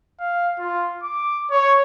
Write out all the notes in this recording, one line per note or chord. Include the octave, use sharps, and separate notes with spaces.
F5
F4
D6
C#5